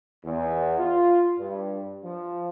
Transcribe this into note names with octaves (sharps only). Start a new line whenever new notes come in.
E2
F4
G2
F3